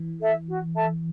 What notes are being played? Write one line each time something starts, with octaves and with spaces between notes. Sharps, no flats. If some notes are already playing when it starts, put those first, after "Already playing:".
Already playing: E3
A4 E5
F#4
A4 E5 A5